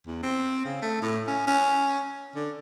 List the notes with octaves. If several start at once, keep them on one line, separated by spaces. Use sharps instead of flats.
E2
C4
C#3
A3
A2
C#4
C#4
D3